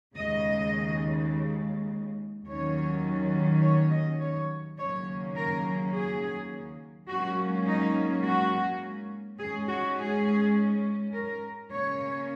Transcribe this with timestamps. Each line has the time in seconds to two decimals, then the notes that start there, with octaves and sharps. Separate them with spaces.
0.14 D#2 C#3 G#3 D#5
2.47 D#2 D#3 F#3 C#4 C#5
3.61 C#5
3.90 D#5
4.20 C#5
4.78 D#2 C#3 F#3 A#3 C#4 C#5
5.35 A#4
5.93 G#4
7.08 G#2 F#3 A#3 C#4 F#4
7.66 D#4
8.25 F#4
9.39 G#2 G#3 C#4 G#4
9.68 F#4
9.98 G#4
11.12 A#4
11.70 C#3 A#3 C#4 C#5